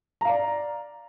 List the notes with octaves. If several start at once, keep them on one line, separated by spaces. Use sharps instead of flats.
D5 F5 A#5